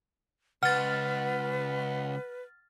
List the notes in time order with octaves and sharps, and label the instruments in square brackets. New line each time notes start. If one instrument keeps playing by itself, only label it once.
[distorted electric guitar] C#2 [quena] B4 [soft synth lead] F#5 [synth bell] F6 A6